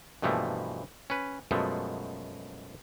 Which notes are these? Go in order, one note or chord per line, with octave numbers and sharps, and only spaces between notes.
G2 B2 E3 F3 A3 A#3
C#4 B4
F#2 B2 F3 G#3 A3